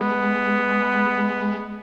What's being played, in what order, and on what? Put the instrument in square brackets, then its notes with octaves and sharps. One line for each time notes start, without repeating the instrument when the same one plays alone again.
[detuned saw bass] G#3 [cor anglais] B3